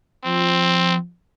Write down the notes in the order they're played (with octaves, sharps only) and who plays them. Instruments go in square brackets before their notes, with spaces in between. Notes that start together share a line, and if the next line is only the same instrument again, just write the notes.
[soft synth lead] F3 [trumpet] C4